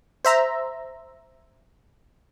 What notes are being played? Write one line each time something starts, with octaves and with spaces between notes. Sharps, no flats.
C5 E5 A#5